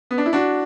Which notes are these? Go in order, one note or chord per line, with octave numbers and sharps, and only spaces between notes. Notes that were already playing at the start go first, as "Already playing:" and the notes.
B3
D4
E4
D4 F#4